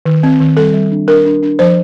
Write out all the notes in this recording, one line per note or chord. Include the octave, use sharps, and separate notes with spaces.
D#3
C4
D#3
G3 A4
G3
D4
D4 A#4
D4
D4
F3 C5